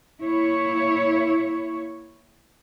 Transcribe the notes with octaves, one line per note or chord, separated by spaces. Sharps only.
A#3 E4 C#5